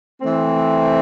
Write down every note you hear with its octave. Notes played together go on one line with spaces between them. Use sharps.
E3 A3 C4